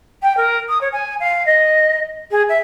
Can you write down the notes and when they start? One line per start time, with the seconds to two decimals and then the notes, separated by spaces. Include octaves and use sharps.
0.22 G5
0.37 A#4
0.68 D#6
0.81 C#5
0.92 G#5
1.20 F5
1.46 D#5
2.31 G#4
2.49 E5